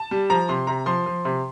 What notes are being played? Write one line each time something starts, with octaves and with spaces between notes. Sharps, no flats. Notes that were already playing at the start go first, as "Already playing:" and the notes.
Already playing: A5
G3
F3 A#5
C3 C6
C3 A#5
F3 C6
F3
C3